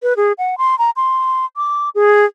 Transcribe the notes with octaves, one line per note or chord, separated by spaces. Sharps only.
B4
G#4
F#5
C6
A#5
C6
D6
G#4